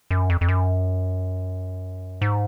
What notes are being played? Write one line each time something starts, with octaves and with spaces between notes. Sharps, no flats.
F#2
F2
F2
F#2
G#2